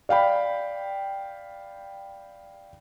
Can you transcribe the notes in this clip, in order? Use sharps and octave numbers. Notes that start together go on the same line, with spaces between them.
D5 F5 G5 B5